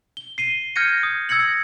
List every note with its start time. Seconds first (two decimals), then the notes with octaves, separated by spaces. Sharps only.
0.17 G7
0.38 C7 D#7 G7
0.76 F6 G6 G#6 A#6 C#7 D#7
1.03 D#6
1.29 E6 G#6 A#6 C#7 F#7